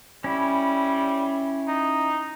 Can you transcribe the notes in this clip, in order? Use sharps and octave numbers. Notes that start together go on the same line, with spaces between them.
G3 C#4 E4
D#4